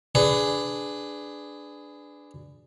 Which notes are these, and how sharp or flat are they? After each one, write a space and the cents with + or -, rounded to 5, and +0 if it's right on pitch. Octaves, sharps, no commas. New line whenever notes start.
D4 +0 G#4 +0 B4 +20